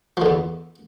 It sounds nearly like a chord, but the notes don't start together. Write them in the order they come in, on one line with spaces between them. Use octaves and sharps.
F3 D3 E2